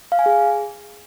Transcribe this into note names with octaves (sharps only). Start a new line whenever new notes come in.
F5
G#5
G#4